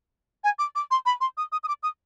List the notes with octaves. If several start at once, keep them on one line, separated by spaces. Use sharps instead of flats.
G#5
D6
D6
C6
B5
C6
D#6
D#6
D#6
D6
D#6